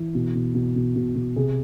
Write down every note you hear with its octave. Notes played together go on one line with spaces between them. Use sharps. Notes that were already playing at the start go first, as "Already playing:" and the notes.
Already playing: E3
B2
B2
B2
B2
B2
B2
C3 G#4